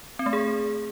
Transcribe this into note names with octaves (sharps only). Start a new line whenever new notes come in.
C4
A3
G#4